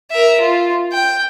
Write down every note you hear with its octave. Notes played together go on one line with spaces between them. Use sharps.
A#4 E5
F4
G5